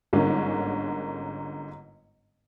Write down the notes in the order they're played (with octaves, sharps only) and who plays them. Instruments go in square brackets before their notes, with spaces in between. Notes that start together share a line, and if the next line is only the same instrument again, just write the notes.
[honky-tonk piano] G1 G#2 D3 A#3 C#4